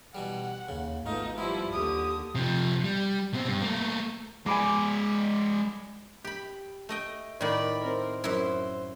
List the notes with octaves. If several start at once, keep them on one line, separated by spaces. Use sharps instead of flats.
B2 E3 G3 F#5
D#2 C#3
G#1 A3 B3 D#4 F4
F3 G3 B3 E4
D#2 D3 G4 D#6
C3 F3
G3
B2 C4
G2
A3 A#3
G#3 D5 G#5 B5 D6
G4 B5
A3 D#5 G5
A2 D#3 D5 B5
C4 A#4
F#2 E4 C5